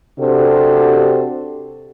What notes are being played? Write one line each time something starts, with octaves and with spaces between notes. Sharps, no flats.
C3 D4 F#4 G4 A4 C5